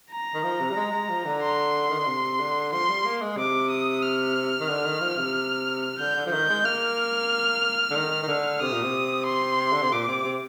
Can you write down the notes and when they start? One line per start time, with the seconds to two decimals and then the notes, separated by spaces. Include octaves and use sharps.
0.11 A#5
0.34 D#3
0.43 F3
0.60 C3
0.71 G3
0.76 G#3
0.92 G#3
1.09 F3
1.25 D3
1.42 C6
1.90 D#3
1.98 D3
2.07 C3
2.40 D3
2.72 F3 C6
2.89 G3
3.05 A#3
3.21 G#3
3.37 C3 D6
3.71 D#6
4.02 F6
4.60 D#3
4.68 D3
4.85 D#3
5.01 F3
5.18 C3
5.99 D3 G6
6.16 D3
6.26 F3
6.32 D#3 G6
6.49 G#3
6.65 A#3 F6
7.91 D3
7.96 D#3
8.23 D#3
8.28 D3
8.61 C3 D#6
8.72 A#2
8.83 C3
9.26 C6
9.73 D3
9.82 C3
9.91 A#2 D6
10.08 C3
10.24 C3